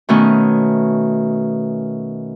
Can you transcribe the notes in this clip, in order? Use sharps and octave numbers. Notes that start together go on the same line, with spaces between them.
B2 D#3 A3 C#4